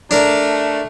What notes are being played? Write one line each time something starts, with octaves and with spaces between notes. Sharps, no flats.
A3 D4 A#4